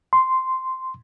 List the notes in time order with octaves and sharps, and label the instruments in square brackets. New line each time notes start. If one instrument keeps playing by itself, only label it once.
[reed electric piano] C6